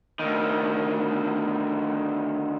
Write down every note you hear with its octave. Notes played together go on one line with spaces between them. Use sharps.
D2 D#3